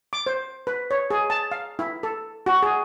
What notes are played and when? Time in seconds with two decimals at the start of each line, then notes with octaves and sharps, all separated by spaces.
0.13 D6
0.26 C5
0.67 B4
0.91 C#5
1.11 G#4
1.30 A5
1.51 F5
1.79 E4
2.03 A4
2.46 F#4
2.63 G#4